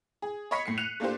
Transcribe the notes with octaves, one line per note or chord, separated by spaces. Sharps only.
G#4
C#5 D#5 B5 C#6 B6 C#7
A2 C7 C#7
F#6 C#7 D#7 F7
A3 A#3 D4 F4 G4 C5